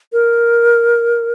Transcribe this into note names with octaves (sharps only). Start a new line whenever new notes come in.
A#4